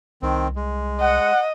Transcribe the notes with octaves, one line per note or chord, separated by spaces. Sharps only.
C2 D#3 C4
G#3
D#5 F#5